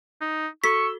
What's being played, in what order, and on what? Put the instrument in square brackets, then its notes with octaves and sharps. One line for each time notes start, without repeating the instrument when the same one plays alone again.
[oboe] D#4
[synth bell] F#4 A4 G7 [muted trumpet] C#6 [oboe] E6 [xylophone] B6